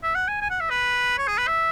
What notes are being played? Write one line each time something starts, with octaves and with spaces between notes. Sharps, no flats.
E5
F#5
G#5
G#5
F#5
E5
B4
C#5
G#4
B4
E5